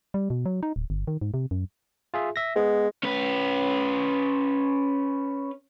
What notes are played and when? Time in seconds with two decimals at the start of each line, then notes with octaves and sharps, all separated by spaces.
0.14 G3
0.30 B2
0.46 F#3
0.63 D#4
0.76 D1
0.90 G1
1.07 D#3
1.21 G#2
1.34 C3
1.51 F#2
2.14 F4 G#4 E5
2.36 E5 A#6
2.56 G#3 B3
3.03 C#4 B4